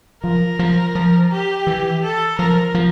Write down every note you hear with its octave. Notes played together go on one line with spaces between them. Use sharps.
F3 A#4
F3
F3
G4
E3
A4
F3 A#4
F3